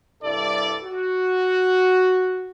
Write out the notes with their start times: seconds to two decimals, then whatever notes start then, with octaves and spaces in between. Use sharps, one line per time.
0.23 C2 G2 E4 A4 D5
0.84 F#4